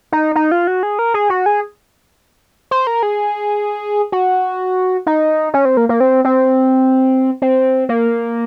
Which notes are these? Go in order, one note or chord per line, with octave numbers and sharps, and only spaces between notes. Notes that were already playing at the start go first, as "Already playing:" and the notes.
D#4
D#4
F4
F#4
G#4
A#4
G#4
F#4
G#4
C5
A#4
G#4
F#4
D#4
C#4
C4
A#3
A#3
C4
C4
C4
A#3